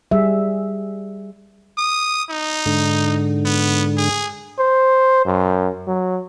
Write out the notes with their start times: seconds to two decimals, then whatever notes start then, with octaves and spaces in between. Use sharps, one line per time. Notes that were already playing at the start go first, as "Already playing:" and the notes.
0.11 G3 G#4 E5
1.78 D#6
2.30 D#4
2.66 G#2 D3
3.45 B3
3.98 G#4
4.59 C5
5.25 F#2
5.88 F#3